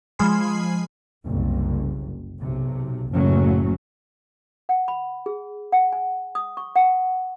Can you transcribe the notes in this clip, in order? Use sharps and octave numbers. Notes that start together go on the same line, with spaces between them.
F3 G#3 G#5 B5 C7
F#1 C2
B1 C3
F#1 A2 F#3 A3 C#4
F#5
B5
G#4
F#5
G#5
D#6
C#6
F#5